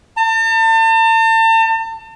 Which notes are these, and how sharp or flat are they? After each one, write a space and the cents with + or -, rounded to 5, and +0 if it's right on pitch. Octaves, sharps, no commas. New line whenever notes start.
A5 +40